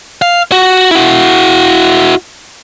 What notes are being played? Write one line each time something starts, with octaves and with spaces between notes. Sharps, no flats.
F5
F#4
E4 F#4